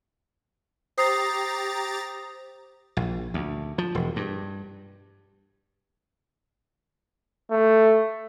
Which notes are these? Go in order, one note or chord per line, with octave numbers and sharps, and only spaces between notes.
G4 C5 A#5 D#6 A6 C7
A#1
D2
F3
E1
G2
A3